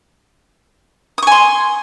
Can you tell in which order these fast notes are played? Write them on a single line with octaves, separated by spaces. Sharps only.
D#6 C#6 G#5 C6